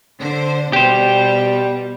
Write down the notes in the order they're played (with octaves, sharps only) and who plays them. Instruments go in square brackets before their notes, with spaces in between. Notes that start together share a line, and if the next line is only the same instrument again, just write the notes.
[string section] D3 C5
[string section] B2 G3 [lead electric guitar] G4 C5